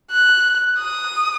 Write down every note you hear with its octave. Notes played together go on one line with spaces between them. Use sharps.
F#6
D#6